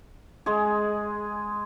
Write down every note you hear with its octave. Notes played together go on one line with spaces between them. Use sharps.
G#3 G#4